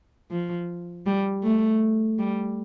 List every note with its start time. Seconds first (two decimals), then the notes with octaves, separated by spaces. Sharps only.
0.31 F3
1.06 G3
1.44 A3
2.19 G3